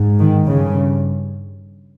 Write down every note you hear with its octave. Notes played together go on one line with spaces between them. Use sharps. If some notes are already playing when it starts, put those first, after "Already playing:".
Already playing: G#2
D#3
G2 C#3